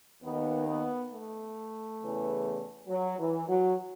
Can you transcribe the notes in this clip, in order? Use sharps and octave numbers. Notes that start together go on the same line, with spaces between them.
D#2 D#3 B3
B3
A3
E2 C#3 E3
F#3
E3
F#3